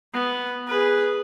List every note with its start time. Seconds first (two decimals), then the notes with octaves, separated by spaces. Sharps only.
0.14 B3
0.68 G#4 B4